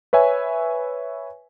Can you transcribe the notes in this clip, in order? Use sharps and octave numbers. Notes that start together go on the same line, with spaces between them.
B4 C#5 E5 G#5